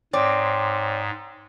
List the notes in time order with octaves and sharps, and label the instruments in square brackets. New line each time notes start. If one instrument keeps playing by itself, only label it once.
[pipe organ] G#2 [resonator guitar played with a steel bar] C4 [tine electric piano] C#5 [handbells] D5 D6